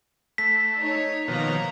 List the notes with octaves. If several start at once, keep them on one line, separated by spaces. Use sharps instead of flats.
A3 B6
D#4 C#5
B2 D#3 F3 A#3 C#5 A#5